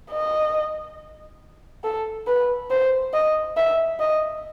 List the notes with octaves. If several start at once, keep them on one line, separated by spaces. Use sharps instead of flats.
D#5
A4
B4
C5
D#5
E5
D#5